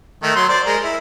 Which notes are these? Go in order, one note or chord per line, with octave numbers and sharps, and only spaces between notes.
D#3 A3
F#3 C6
C5 D5
G#3 A#4
E4